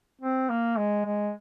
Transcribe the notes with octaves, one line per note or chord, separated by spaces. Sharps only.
C4
A#3
G#3
G#3